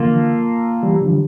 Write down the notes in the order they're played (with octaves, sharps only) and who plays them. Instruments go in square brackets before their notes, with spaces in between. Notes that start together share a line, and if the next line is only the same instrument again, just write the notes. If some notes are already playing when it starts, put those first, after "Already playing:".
Already playing: [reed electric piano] D3 E3 F3 [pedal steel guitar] A#3 F4 A4
[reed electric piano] E3 G3
D3 F3